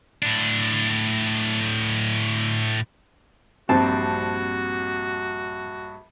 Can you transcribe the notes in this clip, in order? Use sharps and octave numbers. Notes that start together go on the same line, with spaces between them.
A2 D4
A#1 G2 C4 F#4 A5